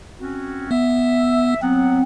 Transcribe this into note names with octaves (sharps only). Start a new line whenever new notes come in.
C4 C#4 F#4
B3 E5
F#3 B3 C4 F#5